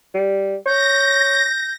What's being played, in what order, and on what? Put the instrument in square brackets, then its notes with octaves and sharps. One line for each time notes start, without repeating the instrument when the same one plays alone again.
[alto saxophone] G3
[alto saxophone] C#5 [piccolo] G6 [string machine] A#6